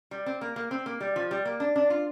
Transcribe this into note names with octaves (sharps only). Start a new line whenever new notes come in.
G3
C4
A#3
A#3
C4
A#3
G3
F3
G3
A#3
D4
D4
F4